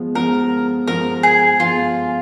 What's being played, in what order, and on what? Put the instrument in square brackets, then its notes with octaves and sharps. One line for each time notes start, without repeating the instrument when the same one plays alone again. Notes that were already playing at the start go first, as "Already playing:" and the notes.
Already playing: [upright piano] F3 G#3 B3
[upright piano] F3 G#3 B3 [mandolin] A#4
[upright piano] F3 G#3 B3 [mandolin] A#4
[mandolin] G#4
[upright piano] F3 G#3 B3 [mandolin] F4